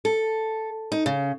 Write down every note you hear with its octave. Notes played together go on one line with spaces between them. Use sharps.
A4
D#4
C#3